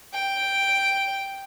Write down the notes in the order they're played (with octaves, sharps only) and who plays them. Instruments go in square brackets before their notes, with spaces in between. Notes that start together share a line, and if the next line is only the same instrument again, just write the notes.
[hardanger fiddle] G5